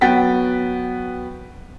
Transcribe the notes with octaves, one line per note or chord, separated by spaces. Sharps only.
F#3 B3 G5 A6 B6